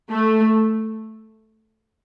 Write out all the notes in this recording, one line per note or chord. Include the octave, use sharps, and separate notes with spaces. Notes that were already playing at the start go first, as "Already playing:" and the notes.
A3